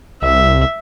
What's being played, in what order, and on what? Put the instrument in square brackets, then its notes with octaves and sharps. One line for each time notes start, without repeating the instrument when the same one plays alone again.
[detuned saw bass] C2 [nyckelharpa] E5